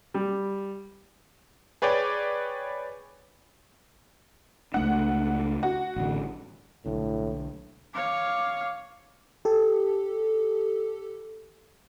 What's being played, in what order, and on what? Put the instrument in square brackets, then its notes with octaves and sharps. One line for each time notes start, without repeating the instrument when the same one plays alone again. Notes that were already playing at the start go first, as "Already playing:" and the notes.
[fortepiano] G3
[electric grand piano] G#4 B4 C#5 D5 G5
[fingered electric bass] C#2 A3 D4 [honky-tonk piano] F#5
[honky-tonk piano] F#4
[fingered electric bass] A1 D3
[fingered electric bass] B1 D3 [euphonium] A2
[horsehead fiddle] C#5 F5 [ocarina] D6
[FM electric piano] G4 A4